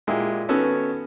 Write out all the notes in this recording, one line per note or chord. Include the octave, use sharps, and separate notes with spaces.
A#2 G#3 E4 G4
D#3 B3 C#4 F#4 A4 C#5